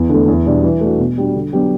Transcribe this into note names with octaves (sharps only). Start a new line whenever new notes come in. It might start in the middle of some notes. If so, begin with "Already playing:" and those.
Already playing: E2
D3 A3
E2
B2 G3 D4
E3
A3 D4 F#4
B2
G3 D4 F#4
D3
F#3 B3 D4 G4